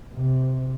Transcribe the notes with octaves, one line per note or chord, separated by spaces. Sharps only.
C3